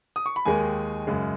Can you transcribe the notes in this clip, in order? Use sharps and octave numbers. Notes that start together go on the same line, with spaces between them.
D#6
C#6
B5
D#2 D#3 G#3 G#5
F#2 C#3 G#3